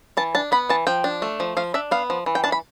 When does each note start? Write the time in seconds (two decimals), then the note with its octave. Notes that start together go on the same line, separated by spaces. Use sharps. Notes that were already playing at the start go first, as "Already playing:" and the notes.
0.17 E3 A5
0.35 D4 A5
0.52 B3 B5
0.69 E3 A5
0.87 F3 G5
1.04 D4
1.22 A3
1.40 F3
1.57 F3 F5
1.74 D4 E5
1.91 B3 F5
2.10 F3
2.26 E3
2.35 G5
2.44 D4 A5
2.52 B5